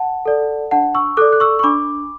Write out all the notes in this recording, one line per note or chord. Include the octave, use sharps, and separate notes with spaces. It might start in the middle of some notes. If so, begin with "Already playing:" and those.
Already playing: F#5 A5
A4 D5
D4 F#5 A5
C#6 E6
A4 D5 D6 F#6
F#6
C#6 E6
C#6
D4 B5 D6